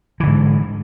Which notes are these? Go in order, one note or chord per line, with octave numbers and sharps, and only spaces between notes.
G#2 D3 E3